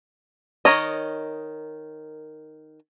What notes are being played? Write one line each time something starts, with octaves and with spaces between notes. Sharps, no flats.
D#3 D#4 A#4 C#5 D#5